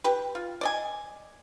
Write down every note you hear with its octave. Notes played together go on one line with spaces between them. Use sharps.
G4 B4
F4
D5 D#5 G#5